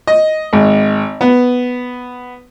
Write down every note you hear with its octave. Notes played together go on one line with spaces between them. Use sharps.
D#5
G#1
B3